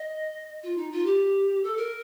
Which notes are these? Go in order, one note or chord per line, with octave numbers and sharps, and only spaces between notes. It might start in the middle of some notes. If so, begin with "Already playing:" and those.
Already playing: D#5
F4
D#4
F4
G4
A4
A#4